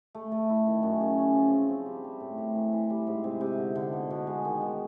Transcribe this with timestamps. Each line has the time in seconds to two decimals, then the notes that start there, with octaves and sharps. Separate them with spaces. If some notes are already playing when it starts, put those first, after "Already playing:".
0.15 A3
0.32 A3
0.49 E4
0.67 D#3
0.83 F#2
1.01 C#3
1.18 C#4
1.35 F3
1.52 C4
1.69 C4
1.86 G3
2.04 G3
2.20 A2
2.38 A2
2.55 E3
2.73 E3
2.90 G3
3.07 G#2
3.24 C3
3.41 C3
3.58 D3
3.75 D3
3.93 B2
4.11 B2
4.27 G#3
4.45 D#3
4.61 G#3